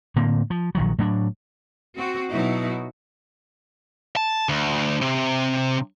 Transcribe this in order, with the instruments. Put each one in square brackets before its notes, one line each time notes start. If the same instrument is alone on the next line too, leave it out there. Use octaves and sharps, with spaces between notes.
[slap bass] A2 D3 A#3 C4
F3
A#1 D#3 F#3
A2 F#3 B3 D4
[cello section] C4 F#4
B2 F#3 D#4 E4 F#4
[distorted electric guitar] A5
D2
C3